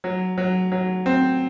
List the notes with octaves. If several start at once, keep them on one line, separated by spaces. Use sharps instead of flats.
F#3
F#3
F#3
C4